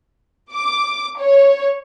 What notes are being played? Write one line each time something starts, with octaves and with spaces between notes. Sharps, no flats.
D6
C#5